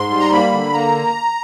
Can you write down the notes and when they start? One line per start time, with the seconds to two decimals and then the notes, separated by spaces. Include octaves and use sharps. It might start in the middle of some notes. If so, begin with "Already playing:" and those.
Already playing: G#2 C6
0.10 G3
0.20 A#5
0.32 A#3 B5
0.53 D3
0.73 A#3 A#5